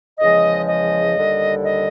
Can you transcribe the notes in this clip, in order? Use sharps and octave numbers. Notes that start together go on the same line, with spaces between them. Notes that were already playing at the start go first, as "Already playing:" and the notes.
E2 C#3 F3 G#3 D#5
D#5
D#2 D3 G3
D#5